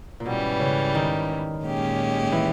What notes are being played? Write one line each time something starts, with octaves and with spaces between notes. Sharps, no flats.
A#2
G#2 B2 E3 G3 C#4
C#3
D#3
A#2 G#3 C#4 G4
E3